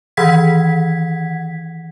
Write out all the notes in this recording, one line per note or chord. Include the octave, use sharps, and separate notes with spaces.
D#3 E3 F#5 G#6 B6